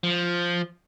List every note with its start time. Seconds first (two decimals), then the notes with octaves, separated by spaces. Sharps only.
0.04 F3